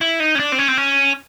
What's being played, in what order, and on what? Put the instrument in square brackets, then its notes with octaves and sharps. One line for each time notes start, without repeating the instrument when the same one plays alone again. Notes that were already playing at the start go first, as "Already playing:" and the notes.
[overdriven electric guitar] E4
D#4
C#4
D4
C4
C#4
C4
C#4